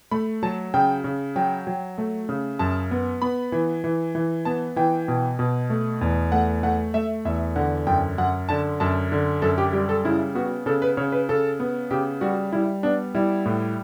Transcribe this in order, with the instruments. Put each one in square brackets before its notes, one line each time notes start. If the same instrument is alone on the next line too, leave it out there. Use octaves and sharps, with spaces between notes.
[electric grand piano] A3 B5
F#3 A5
C#3 G5
C#3
F#3 G5
F#3
A3
C#3
F#2 A5
B3
B3 B5
E3
E3
E3
B3 A5
E3 G5
B2
B2
A3
E2
A3 F#5
A3 F#5
A3 E5
E2 E5
D3 F#5
F#2 G5
F#2 F#5
D3 A5
F#2 A5
D3
F#2 A4
G4
G3 G4
A4
C#3 E4
B3 F#4
C#3 A4
B4
C#3 C#5
B4
C#3 A4
B3
C#3 G4
G3 F#4
G3 E4
B3 D4
G3 E4
A2